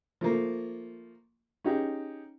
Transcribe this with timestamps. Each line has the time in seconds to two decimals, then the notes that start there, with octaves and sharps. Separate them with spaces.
0.21 F3 A3 A#3
1.64 C#4 D#4 G4 G#4